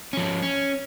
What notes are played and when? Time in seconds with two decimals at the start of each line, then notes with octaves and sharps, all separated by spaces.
0.13 F3 C#4
0.42 C#4